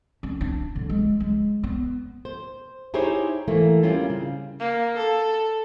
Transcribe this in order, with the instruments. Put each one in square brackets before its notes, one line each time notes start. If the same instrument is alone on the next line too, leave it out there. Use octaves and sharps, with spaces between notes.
[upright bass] C#4
D4
D3
G#3
G#3
B3
[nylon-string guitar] C5
D#4 E4 G4 G#4 C5 C#5
E3 A3 A#3
G3 A#3 C4 C#4 F4
C#3
[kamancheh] A#3
A4